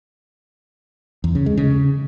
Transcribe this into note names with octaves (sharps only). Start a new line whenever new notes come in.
E2
C#3
G#3
C#3